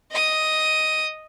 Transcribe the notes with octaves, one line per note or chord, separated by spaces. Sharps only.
D#5 D#6